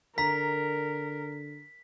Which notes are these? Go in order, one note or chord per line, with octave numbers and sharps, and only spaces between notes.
D3 A#4 A#5 B6